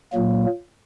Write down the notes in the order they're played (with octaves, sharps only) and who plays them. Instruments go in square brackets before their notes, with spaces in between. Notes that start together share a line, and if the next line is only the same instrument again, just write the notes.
[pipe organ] A#2 F#3 A#3